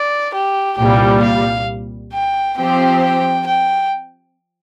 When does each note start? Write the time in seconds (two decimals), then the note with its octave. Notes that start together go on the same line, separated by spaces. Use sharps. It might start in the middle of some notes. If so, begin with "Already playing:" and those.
Already playing: D5
0.34 G4
0.78 C2 A#2 G3 G4
1.23 F5
2.13 G5
2.58 F3 C4 G4 C5 G5
3.03 G5
3.47 G5